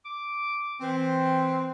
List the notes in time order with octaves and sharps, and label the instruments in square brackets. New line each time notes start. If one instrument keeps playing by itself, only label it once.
[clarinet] D6
[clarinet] E3 [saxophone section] C4